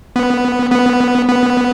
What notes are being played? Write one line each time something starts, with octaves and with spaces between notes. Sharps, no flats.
B3
B3
B3